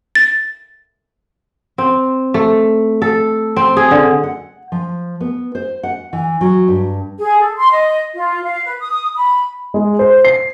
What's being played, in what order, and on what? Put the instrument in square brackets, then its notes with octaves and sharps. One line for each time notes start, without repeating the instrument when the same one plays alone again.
[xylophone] A6
[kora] C4
A3
A4
C4
G#4
D3
[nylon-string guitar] F#5
F3
B3
C5
F#5
E3
F#3
G2
[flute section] G#4
A4
C6
D#5
F4
F5
B4
D#6
B5
[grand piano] G#3
C5
C7